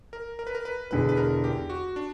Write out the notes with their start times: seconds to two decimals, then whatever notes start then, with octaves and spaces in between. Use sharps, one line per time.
0.13 A#4
0.39 A#4
0.47 B4
0.55 A#4
0.65 B4
0.91 E1 E2 D3 B4
1.09 B4
1.17 A#4
1.44 G4
1.70 F#4
1.96 D4